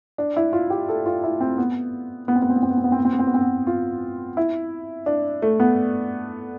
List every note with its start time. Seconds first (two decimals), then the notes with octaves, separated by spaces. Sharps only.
0.18 D4
0.37 E4
0.53 F4
0.70 G4
0.89 A4
1.06 F4
1.24 E4
1.40 C4
1.58 B3
2.28 B3
2.35 C4
2.42 B3
2.50 C4
2.56 B3
2.63 C4
2.70 B3
2.78 C4
2.84 B3
2.92 C4
2.99 B3
3.05 C4
3.13 B3
3.19 C4
3.27 B3
3.34 C4
3.41 B3
3.67 F4
4.37 E4
5.06 D4
5.42 A3
5.60 B3